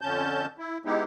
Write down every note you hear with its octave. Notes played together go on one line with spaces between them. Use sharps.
F2 D3 C#4 A5 G6
E4
G#3 B3 D#4 E4 G4